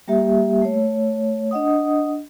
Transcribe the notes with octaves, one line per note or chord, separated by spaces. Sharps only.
G3 A#3 G4 E5
A3 C#5
D4 D#5 F#5 D#6